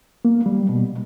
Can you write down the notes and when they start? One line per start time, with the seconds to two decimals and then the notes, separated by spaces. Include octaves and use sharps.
0.25 A#3
0.46 G3
0.69 B2